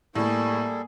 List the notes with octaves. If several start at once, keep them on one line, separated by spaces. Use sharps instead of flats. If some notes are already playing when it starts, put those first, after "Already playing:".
A2 G3 A#3 G#4 A4